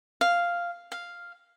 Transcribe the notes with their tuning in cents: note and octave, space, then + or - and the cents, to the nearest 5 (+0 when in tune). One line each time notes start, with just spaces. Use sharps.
F5 -5
F5 +0